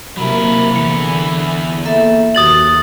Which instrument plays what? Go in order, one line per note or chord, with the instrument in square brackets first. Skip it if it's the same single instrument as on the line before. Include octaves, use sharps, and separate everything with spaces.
[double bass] C3 A#3 [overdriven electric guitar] F#3 E4 [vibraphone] B5
[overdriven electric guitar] E2 E3 [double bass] D3 [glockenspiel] C#7
[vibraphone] A#3 A4 E5
[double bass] D#2 [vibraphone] F#4 [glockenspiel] D#6 A6 F#7